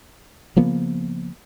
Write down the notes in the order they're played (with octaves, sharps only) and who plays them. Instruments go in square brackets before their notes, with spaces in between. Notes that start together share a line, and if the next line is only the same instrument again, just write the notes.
[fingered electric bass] C#3 F3 A#3 B3